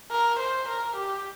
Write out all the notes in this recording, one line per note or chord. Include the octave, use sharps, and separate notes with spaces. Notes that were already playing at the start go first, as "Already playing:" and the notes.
A#4
C5
A#4
G4